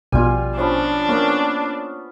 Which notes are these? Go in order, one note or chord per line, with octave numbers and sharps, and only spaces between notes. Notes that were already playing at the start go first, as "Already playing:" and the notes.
A#1 B2 G3 F4 G#5
F3 C#4 D4 B5
A#3 B3 C#4